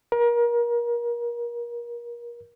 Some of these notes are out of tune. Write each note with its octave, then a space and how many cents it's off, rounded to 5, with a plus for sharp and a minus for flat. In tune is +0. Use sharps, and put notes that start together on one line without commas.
A#4 +30